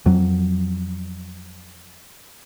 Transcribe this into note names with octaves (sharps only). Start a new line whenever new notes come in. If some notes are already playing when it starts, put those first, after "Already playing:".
F2 F#3